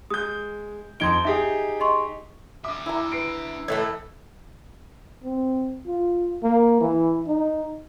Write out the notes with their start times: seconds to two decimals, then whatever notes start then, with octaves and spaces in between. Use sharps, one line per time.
0.10 G#3 D#6 G6
1.00 F2 D#4 C6 G#6 D7 G7
1.25 D#4 G4 G#4 E5
1.80 D#5 C6 C#6
2.64 D4 E5 D6
2.86 E4 A#5
3.12 B4 C7 D7
3.68 A2 E3 A3
5.24 C4
5.87 F4
6.43 A#3
6.81 E3
7.27 D#4